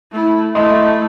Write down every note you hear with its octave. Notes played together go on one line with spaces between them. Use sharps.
A3 E4
A3 E4 D#5 C6 D#6